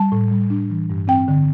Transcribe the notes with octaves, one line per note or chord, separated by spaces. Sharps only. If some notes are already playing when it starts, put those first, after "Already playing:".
Already playing: G3 A5
A2
G3
D4
E3
G2
C4 G5
D3